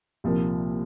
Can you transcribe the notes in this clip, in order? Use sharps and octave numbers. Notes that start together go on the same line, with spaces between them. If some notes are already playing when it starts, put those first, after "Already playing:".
C2 A#2 F3 A#3